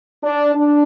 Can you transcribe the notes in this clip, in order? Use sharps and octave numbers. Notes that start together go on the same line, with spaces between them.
D4
D4